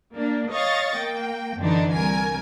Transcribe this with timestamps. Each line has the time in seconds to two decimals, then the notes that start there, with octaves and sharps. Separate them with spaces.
0.15 A#3 D4
0.52 C#5 D#5 F5 C#6 A6 A#6
0.96 A#3 G5
1.58 F#2 D3 E3 D4 D#4
1.92 C2 A#4 G#5